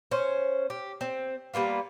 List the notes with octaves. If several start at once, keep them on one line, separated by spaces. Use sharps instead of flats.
C#4 C5
G4
C4
G3 A#3 B3 F4